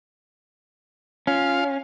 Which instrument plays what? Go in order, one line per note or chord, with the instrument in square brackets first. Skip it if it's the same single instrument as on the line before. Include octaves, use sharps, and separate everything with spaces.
[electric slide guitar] C#4 [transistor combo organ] F4 F5